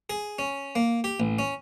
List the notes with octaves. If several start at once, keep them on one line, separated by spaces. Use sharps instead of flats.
G#4
C#4
A#3
G4
A1
C#4